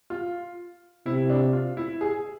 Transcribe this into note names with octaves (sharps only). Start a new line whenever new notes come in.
F4
C3 E4
D4
F4
E4
G#4